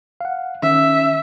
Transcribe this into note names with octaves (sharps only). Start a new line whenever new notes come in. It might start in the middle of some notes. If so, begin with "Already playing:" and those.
F5 F#5
D#3 C#4 E5